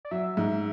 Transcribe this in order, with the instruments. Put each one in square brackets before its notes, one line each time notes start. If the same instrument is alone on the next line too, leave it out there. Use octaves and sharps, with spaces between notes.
[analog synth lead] D5
[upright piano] F#3 [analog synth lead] E5
[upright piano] G#2